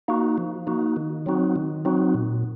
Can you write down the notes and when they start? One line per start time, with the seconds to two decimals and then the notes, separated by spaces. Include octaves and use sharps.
0.08 A#3 D#4 F#4
0.38 F3
0.67 A#3 D#4 F#4
0.96 D#3
1.26 F#3 C4 D#4 F#4
1.56 D#3
1.85 F#3 C4 D#4 F#4
2.14 A#2